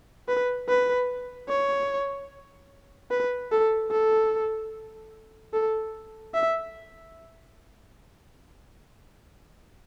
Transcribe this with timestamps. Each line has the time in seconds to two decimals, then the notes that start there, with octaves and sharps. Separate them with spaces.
0.29 B4
0.69 B4
1.49 C#5
3.11 B4
3.52 A4
3.92 A4
5.53 A4
6.35 E5